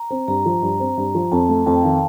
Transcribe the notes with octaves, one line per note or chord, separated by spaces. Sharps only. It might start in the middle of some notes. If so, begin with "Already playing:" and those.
Already playing: A#5
C4
G2 A#5
F3
G2
C4
G2
F3
F2 A5
A3
F2 A5
G5
D#3 F5
G5